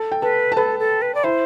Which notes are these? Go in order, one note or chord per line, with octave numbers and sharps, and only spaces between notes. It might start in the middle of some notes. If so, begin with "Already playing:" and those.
Already playing: A4 A5
G5
A4 B4 A5
A5
A4 B4 B5
A4
B4
D5
E4 C5 E5